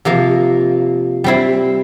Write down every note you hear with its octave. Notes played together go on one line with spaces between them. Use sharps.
C3 F3 A#3
G3 C4 E4